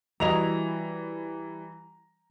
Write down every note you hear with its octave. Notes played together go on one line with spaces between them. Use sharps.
E3 G3 E4 F#4 D#5 A#5 F7